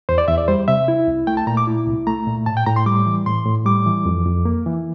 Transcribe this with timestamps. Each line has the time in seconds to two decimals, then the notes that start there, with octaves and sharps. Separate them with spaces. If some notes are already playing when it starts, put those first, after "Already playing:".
0.09 E2 C5
0.18 D5
0.28 E2 E5
0.38 D5
0.48 G3 C5
0.68 C3 E5
0.88 E4
1.08 C2
1.27 A3 G5
1.37 A5
1.47 A#2 A#5
1.57 D6
1.67 E4
1.87 C2
2.07 A3 A#5
2.27 A#2
2.46 A2 A5
2.57 G5
2.66 A2 A#5
2.76 C6
2.86 G3 D6
3.06 E3
3.26 A2 C6
3.46 A2
3.65 G3 D6
3.86 E3
4.05 F2
4.26 F2
4.45 A#3
4.66 E3